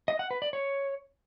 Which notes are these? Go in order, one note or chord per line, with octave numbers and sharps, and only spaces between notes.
D#5
F#5
B4
D5
C#5